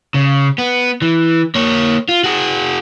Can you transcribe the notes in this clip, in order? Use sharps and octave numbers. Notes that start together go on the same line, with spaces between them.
C#3
B3
E3
A#3 C#5
F4
F#4 G#4